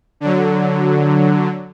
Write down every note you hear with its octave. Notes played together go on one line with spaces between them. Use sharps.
D3 F#3